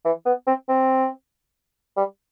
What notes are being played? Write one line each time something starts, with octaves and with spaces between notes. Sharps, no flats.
E3
B3
C4
C4
G3